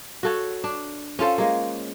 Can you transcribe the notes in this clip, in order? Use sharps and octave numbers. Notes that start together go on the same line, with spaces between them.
F#4 A4 C#5
D4
C#4 F4 A4 C5
G#3 A#3